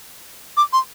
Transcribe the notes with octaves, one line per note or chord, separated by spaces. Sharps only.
D6
C6